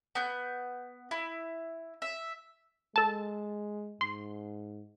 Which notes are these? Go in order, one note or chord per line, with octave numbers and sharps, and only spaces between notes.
B3 G6
E4
E5
G#3 A4 A5
G#2 C6